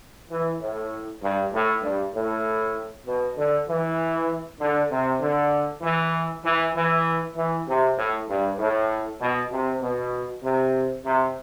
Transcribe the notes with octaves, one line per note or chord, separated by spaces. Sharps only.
E3
A2
G2
A2
G2
A2
B2
D3
E3
D3
C3
D3
E3
E3
E3
E3
C3
A2
G2
A2
B2
C3
B2
C3
C3